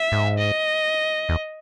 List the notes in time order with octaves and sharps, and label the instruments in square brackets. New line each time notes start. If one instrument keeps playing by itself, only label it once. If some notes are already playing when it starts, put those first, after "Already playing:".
Already playing: [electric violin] E5
[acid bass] G#2
[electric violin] D#5
[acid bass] E2